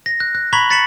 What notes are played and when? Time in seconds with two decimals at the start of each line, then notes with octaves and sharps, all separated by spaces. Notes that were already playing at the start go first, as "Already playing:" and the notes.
0.06 A#6
0.20 F#6
0.35 F#6
0.53 A#5 B5 C#6 G#6 B6 F#7
0.70 F#6 A6 B6 C#7 E7 F#7